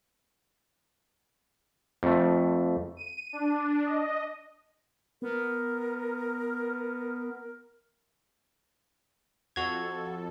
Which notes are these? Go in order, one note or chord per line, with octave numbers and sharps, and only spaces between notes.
F2 A3
D#7
D4
D#5
B3 A#4
F2 F#4 A4 G#6